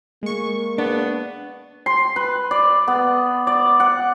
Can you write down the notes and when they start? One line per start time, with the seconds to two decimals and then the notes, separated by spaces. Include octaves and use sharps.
0.23 G#3 A#3 C#6
0.78 B3 D4
1.86 C6
2.16 B4
2.51 D5
2.88 B3
3.47 D5
3.80 F#5